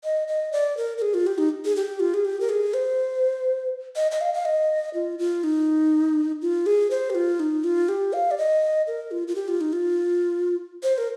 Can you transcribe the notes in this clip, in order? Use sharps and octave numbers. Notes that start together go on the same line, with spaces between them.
D#5
D#5
D5
A#4
A#4
G#4
F4
G4
D#4
G#4
G4
F4
G#4
G4
A#4
G#4
C5
D#5
D#5
F5
F5
D#5
F4
F4
D#4
F4
G#4
C5
G4
F4
D#4
F4
G4
F5
D5
D#5
A#4
F4
F4
G4
F4
D#4
F4
C5
A#4